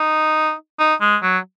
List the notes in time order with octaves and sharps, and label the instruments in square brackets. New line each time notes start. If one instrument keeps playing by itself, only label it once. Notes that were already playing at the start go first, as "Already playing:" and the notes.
Already playing: [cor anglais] D#4
D#4
G#3
F#3